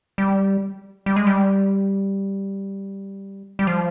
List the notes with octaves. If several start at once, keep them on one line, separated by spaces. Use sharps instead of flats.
G3
G3
G#3
G3
G3
F3